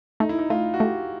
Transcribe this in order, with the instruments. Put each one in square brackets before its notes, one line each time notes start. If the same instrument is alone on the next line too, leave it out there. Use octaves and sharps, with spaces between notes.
[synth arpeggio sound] A3 [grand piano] D#4
[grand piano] E4
D#4
[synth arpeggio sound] A3 [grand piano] F4
[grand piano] F#4
[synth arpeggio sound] A3 [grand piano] G4